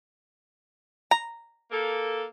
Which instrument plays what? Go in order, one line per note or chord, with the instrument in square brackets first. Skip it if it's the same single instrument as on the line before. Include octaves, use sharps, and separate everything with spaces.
[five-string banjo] A#5
[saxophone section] A#3 A4